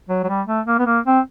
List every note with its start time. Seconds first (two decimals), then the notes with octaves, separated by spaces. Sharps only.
0.09 F#3
0.24 F#3
0.29 G3
0.48 A3
0.67 A#3
0.79 B3
0.86 A#3
1.06 C4